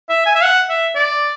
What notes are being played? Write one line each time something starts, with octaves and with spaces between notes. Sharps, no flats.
E5
G#5
E5
F#5
E5
D5